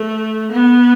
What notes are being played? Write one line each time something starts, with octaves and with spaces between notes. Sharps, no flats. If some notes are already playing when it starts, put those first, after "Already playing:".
Already playing: A3
B3